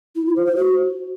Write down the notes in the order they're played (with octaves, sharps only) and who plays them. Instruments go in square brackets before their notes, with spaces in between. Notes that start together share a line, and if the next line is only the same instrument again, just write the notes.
[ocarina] E4
F4
C5
C5
F#4